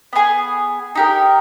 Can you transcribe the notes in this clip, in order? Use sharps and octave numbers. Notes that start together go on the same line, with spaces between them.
B3 D#4 G#4
D#4 G4 A#4